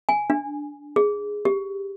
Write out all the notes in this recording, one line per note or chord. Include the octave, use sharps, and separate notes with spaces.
G#5
D4
G#4
G4